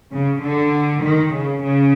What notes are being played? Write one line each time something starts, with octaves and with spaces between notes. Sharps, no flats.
C#3
D3
D#3
C#3
C#3